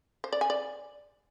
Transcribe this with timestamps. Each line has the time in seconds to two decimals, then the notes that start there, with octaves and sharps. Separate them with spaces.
0.24 C5
0.33 D5
0.41 G#5
0.50 D5